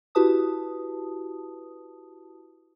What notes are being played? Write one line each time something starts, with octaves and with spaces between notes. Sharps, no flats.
E4 F#4 G4 B4 A5 D#6